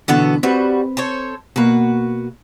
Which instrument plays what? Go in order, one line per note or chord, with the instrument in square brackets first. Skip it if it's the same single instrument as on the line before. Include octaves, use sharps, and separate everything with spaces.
[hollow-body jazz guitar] B2 D3 E3 [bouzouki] B3 F#4 A4
[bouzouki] G3 F#4 [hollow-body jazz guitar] C4 B4
[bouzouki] A4 C5 C#5
[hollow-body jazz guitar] B2 A#3 [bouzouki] F#4 B4